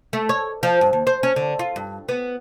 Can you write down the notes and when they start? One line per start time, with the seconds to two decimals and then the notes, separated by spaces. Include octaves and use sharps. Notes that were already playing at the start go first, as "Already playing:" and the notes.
0.13 A3
0.29 C#5
0.63 F3
0.81 G2
0.93 D#2
1.07 C5
1.23 C#4
1.36 D3
1.59 F4
1.76 G2
2.09 B3